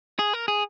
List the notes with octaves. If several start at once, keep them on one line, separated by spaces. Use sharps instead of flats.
G#4
A#4
G#4